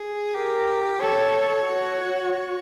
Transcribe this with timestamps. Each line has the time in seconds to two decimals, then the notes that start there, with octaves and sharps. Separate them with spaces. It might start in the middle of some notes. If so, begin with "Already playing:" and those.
Already playing: G#4
0.35 G4 A#4
1.01 A4 C#5
1.66 F#4
2.32 C#5